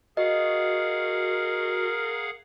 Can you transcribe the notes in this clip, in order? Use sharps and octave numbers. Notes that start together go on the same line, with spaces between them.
F#4 G#4 A#4 D#5 F5 F#5